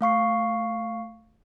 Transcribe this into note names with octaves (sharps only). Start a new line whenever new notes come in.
A3 F5 C#6 C7